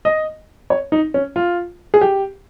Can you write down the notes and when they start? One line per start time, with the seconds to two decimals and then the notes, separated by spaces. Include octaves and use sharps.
0.05 D#5
0.70 C#5
0.92 D#4
1.14 C#4
1.36 F4
1.94 G#4
2.01 G4